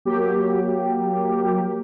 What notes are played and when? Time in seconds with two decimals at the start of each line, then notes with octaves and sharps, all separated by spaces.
0.05 F#3 A#3 G4